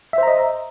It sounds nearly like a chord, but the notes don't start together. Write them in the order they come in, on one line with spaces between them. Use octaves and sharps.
E5 C5 A#5 D#5